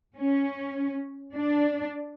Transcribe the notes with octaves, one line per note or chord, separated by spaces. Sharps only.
C#4
D4